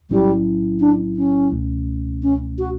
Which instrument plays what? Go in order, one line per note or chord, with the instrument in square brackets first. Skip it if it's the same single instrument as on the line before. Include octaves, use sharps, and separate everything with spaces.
[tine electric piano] B1 A2 F#3 C#4 E4 [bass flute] G3
[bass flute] D4
C#4
[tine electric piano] C#2 B2 A3 C#4
[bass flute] C#4
F#4